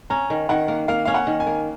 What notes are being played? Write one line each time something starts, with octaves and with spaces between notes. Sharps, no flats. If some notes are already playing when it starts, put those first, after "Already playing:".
C#4 A#5
D#3
D#3 F#5
A#3
A#3 F5
C#4 F5
F#5
D#3
G#5
A#3